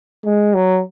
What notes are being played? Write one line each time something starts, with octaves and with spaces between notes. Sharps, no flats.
G#3
F#3